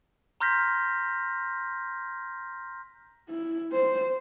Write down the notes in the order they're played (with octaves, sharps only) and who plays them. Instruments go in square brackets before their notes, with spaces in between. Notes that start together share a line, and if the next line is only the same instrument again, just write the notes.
[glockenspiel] A#5 C6 F6 G6 A#6 B6
[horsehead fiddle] E4
C5